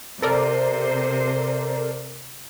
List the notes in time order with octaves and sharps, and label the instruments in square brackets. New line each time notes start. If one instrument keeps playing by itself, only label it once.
[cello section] C3 C5 [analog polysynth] A4 A#4 D5